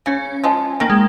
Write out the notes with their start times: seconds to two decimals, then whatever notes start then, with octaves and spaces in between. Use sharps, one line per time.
0.06 C#3 C#4
0.44 F3 G#3
0.80 D#3 A#3
0.90 G#3